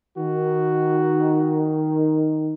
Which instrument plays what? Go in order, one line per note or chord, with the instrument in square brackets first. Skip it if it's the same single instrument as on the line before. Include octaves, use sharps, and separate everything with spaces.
[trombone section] D#3 [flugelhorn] F#4